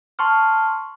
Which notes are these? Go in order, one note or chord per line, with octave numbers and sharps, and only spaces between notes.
A5 C6 C#6 F6